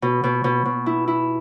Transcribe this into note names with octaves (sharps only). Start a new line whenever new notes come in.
B2
B2
B2
B2
E4
E4